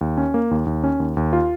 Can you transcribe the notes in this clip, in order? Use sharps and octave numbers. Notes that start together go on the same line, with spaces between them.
D#2
C#4
A#3
D#2
D#2
C#4
D#2
D#2
F4